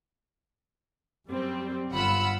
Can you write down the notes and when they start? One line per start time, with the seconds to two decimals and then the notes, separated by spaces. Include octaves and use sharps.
1.28 F#2 G3 C4
1.93 G1 F4 F#5 B5 E6